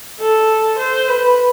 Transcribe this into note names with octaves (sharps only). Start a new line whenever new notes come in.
A4
C5
B4